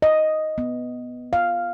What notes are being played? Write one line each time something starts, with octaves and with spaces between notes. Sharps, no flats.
D#5
B3
F5